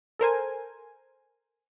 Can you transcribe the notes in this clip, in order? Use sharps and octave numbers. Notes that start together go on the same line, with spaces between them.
A4 A#4 C5 G#5